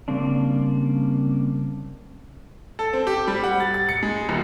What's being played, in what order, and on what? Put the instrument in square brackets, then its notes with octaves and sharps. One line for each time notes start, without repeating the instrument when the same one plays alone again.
[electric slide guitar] C#3 G3 A#3 C4 D4
[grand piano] A4
C4
G4
G3
F#5
A6
A6
C#7
G#3
D#1